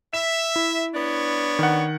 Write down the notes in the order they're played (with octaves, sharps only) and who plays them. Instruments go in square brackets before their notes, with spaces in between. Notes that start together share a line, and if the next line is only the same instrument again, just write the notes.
[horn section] E5 [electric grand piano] E7
[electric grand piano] E4
[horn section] B3 D4 C#5
[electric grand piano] D#3 F#5